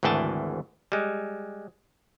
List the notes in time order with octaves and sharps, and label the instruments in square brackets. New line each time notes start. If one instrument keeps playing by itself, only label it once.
[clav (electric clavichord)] G#1 D2 E3 G#4 G5 A5
G3 G#3